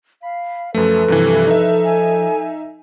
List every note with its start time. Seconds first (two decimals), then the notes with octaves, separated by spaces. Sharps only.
0.23 F5 B5
0.74 F#2 F3 A3 A4 B4
1.08 G2 C3 E3
1.47 D#4 E5
1.85 G#5